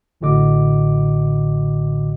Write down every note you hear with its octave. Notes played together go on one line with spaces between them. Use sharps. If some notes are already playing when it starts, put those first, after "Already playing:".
A1 A2 D3 F#4 D#5 D6